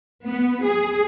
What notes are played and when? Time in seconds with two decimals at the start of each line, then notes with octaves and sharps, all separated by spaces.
0.25 B3
0.64 G#4